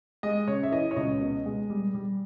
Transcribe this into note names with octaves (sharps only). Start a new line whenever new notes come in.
G#3 D#5
C#3 C#5
E5
E3 D#5
C#5
C#2 D#5
B2
G#3
G3
G3